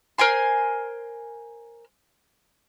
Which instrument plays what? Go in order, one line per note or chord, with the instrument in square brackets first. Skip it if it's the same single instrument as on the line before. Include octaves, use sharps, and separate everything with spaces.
[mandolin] A#4 C5 G#5 C6